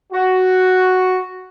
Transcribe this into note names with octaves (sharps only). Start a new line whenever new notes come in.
F#4